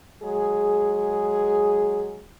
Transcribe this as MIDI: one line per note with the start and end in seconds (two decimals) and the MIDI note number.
0.23 2.22 54
0.23 2.22 56
0.23 2.22 68